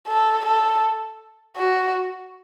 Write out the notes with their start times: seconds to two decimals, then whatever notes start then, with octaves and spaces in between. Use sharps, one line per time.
0.08 A4
0.45 A4
1.57 F#4